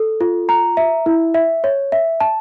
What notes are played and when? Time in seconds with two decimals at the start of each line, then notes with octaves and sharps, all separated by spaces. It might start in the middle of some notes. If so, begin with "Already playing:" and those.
Already playing: A4
0.21 F4
0.49 A#5
0.77 E5
1.06 E4
1.34 E5
1.64 C#5
1.92 E5
2.20 A5